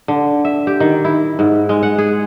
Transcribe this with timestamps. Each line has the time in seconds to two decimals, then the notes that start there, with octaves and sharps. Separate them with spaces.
0.08 D3
0.45 E5
0.67 G4
0.80 D#3
1.05 E4
1.39 G#2
1.69 G#3
1.83 F#5
1.98 G#4